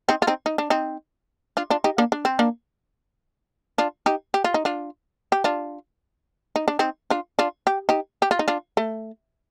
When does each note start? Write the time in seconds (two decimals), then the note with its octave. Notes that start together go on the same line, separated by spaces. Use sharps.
0.09 C4 D#4
0.22 F4
0.27 C4 D#4
0.46 D#4
0.58 D4
0.70 C4 D#4
1.57 D4 F4
1.70 D4 F4
1.84 D#4 G4
1.98 A#3 D4
2.12 D4
2.25 C4
2.39 A#3 D4
3.78 D4 F4
4.06 D#4 G4
4.34 G4
4.44 F4
4.54 D#4
4.65 D4 F4
5.32 G4
5.44 D4 F4
6.56 D#4
6.68 D4
6.79 C4 D#4
7.10 D4 F4
7.39 D4 F4
7.67 G4
7.89 D#4 G4
8.22 G4
8.31 F4
8.39 D#4
8.48 D4 F4
8.77 A3